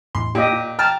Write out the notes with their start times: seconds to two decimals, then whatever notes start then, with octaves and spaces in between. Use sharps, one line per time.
0.15 E2 A2 B3 C6
0.35 A#2 G4 D#5
0.52 F4
0.79 G5 A5 A#5 F6